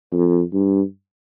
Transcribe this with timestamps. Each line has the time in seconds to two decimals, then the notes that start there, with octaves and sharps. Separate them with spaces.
0.13 F2
0.53 G2